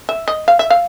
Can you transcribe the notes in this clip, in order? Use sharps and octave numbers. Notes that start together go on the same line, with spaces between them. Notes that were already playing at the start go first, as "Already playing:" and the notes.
E5
D#5
F5
E5
F5